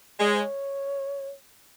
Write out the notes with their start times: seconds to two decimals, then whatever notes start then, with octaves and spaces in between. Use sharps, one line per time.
0.19 G#3 D5
0.27 C#5
0.34 C5
0.40 C#5